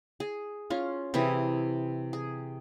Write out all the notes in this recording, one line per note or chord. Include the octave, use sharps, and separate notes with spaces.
G#4
C#4 F4
C3 E3 E4 G#4
G#4